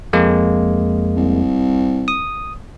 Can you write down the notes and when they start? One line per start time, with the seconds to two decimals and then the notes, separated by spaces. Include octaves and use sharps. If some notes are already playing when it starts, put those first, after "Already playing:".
0.13 F2 G#3 A#3
1.17 C2
2.08 D#6